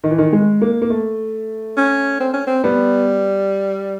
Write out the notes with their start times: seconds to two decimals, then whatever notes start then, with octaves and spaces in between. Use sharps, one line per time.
0.04 D#3
0.11 E3
0.18 D#3
0.33 G#3
0.61 A#3
0.82 A#3
0.90 A3
1.77 C#4
2.20 C4
2.34 C#4
2.47 C4
2.64 G3 B3